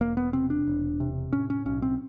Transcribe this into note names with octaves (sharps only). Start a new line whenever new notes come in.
E1 A#3
B3
C3 C4
D4
E1
C3
A2 C#4
C#4
B1 C#4
C4